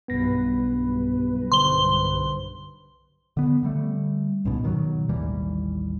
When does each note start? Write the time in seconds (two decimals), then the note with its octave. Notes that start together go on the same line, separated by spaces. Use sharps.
0.08 B1 G2 B3 B4 A#6
1.52 D3 C5 C6 G7
3.37 D3 B3
3.63 D3 G3 A3
4.45 C#2 G#2 B2
4.63 B2 D#3 F3 F#3
5.09 A1 D#2 E3 G3